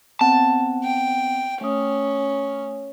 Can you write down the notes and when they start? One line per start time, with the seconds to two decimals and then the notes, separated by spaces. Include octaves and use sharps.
0.21 B3 C4 F#5 A5
0.83 G5
1.61 A3 C#4 D#6